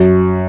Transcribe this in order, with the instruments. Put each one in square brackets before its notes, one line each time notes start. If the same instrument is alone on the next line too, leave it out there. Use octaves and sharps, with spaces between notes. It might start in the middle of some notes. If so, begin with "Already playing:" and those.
Already playing: [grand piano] F#2